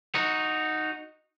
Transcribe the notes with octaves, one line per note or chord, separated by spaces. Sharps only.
D#4 F#4